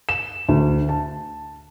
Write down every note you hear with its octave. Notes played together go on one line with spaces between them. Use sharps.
E7
D2
A5